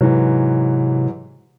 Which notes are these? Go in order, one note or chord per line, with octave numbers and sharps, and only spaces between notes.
G#2 C3 E3 F#3